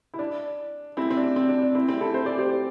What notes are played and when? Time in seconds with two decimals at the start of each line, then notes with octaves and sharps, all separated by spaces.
0.14 E4
0.19 D4
0.97 C4 E4
1.10 C4
1.17 D4
1.36 C4
1.49 D4
1.62 D4
1.75 C4 E4
1.88 C4 E4
2.01 E4 A4
2.14 C5
2.26 D5
2.39 G4 C5